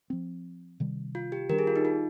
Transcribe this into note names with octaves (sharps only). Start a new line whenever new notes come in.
F3 C4
C3 D#3 G3
F4
G4
D#3 G3 D4 G4 A#4
G#4
F4
D#4
F4